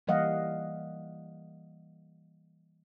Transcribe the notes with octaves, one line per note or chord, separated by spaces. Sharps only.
E3 G3 A#3 D#5 F5 F#5